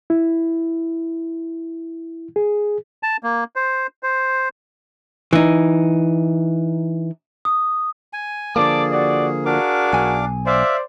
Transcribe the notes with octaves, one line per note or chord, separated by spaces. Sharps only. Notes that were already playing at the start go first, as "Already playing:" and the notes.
E4
G#4
A5
A#3
C5
C5
E3 D#4
D#6
G#5
D3 F3 A#3 G#4 D5 A5 D6
F#4 D5
D4 F#4 G#4 A#4 F5 D6
B1 G#5
C5 D5 E5 F5 D6